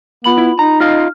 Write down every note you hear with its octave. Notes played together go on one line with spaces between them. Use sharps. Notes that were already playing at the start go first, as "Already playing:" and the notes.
B3 F4 B5 F#7
E4
D#4 A#5
F4 D#5 F5 F6